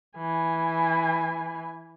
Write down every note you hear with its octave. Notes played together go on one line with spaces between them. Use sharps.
E3 G#5